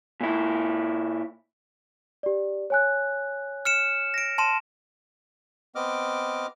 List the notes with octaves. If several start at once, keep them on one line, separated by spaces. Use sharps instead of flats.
A#2 E4
G4 D5
C#5 G#5 F#6
F6 C#7 E7
A#6 D7
A5 C6 E7
B3 C4 D#5 D6 F6